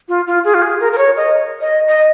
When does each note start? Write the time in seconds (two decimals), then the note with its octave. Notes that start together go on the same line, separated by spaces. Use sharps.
0.09 F4
0.27 F4
0.45 G#4
0.54 F4
0.62 G#4
0.80 A#4
0.92 A#4
0.98 C#5
1.17 D#5
1.61 D#5
1.88 D#5